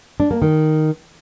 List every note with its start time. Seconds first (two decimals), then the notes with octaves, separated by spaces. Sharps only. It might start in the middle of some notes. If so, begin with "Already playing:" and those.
0.20 D4
0.31 A#3
0.42 D#3